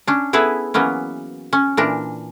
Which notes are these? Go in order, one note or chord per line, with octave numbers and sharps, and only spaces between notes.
C#4 D4
B3 E4 G#4 A4 B4
E3 F#3 A#3 B3 C#4
C#4
A#2 E3 D4 A#4